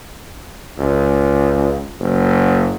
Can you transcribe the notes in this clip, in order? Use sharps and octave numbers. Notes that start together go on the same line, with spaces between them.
C#2
F#1